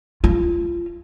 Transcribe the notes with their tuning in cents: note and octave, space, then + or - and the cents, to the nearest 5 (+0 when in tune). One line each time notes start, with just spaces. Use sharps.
F4 -25